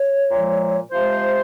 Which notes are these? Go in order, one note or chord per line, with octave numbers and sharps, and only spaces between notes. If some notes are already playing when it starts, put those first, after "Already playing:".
Already playing: C#5
A#2 F3 G#3
C3 F3 G#3 C5